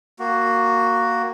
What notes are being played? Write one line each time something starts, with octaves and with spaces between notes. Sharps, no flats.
A#3 F#4